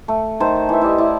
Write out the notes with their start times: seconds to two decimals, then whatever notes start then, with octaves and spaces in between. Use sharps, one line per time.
0.08 A3
0.40 D#3 A3 C5 A5
0.69 E3 E5
0.81 E4 G4 D5 D#5
0.98 E4 D5